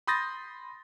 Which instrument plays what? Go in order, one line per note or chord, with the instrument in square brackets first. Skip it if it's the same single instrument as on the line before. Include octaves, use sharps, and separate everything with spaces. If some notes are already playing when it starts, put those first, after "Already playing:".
[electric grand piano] B5 C6 D#6 G6 A6 A#6